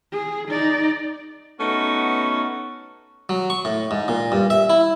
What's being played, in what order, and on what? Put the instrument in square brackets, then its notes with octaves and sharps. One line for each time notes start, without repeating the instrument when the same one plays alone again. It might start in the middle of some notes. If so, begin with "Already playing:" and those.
[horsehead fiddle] G#4
D#4 D5
[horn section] A3 B3 C#4 D#4 F#4
[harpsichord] F#3
C#6
A2
G#2
A#2
G2
E5
E4